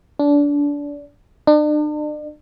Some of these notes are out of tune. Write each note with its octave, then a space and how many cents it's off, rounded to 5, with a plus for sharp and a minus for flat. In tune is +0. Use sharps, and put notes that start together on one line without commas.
D4 -25
D4 +40